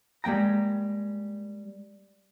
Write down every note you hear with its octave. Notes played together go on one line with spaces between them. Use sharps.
G3 G#3 A#3 G5 A#5